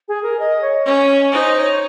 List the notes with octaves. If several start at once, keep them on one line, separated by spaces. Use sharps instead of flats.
G#4
A#4
D#5
C#5
C#4 C#5
C#5
D#4 C5
C#5